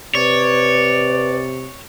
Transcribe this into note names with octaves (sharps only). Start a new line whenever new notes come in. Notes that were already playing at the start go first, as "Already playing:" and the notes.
C3 B4 C#5 D5